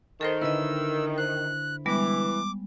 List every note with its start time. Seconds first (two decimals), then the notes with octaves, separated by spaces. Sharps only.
0.21 D#3 A4 A#4 C5 A5 C6
0.42 D3 E4 B4 D#5 E6
1.18 C5 F#6
1.86 E3 G3 G#3 B3 D6